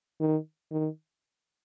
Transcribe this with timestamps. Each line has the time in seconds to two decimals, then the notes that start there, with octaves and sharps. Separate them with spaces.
0.21 D#3
0.72 D#3